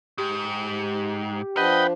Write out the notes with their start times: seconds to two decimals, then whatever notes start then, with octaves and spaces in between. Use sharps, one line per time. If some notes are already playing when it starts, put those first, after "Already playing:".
0.18 G#2 G4
1.57 F3 D4 B4 D#5 F#5 G5